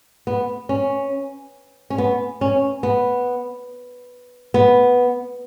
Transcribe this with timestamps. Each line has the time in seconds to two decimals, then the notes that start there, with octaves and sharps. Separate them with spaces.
0.27 B3
0.69 C#4
1.90 C#4
1.98 B3
2.41 C#4
2.83 B3
4.54 B3